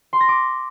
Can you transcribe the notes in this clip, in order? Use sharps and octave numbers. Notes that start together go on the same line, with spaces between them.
C6
A#6
D6